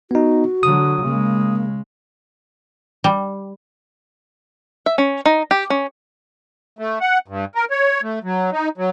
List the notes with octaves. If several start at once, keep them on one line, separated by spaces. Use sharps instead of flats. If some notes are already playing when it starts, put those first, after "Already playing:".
B3 D#4 F#4
D3 F#3 D#6
C#3 G#3 A#3
G3
E5
C#4
D#4
G4
C#4
A3
F#5
G2
A#4
C#5
A3
F#3
D#4
F#3